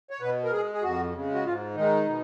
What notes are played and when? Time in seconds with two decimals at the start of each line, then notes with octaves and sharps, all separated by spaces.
0.11 C#5
0.21 B2 B4
0.44 A#4
0.52 G#3 G#4
0.73 G#4
0.82 F2 F#4
1.13 C#3 G#3
1.34 F#4
1.44 G#2 F4
1.75 D#3 G#3 D#4
2.06 B2